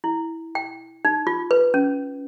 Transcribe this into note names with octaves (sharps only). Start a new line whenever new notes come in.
E4
G5
D#4
F4
B4
C#4